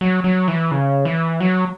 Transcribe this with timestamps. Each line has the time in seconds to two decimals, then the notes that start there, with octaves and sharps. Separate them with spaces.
0.01 F#3
0.24 F#3
0.48 E3
0.71 C#3
1.05 E3
1.40 F#3